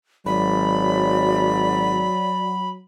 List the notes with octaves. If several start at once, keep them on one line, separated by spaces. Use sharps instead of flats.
G#1 F#3 D5 B5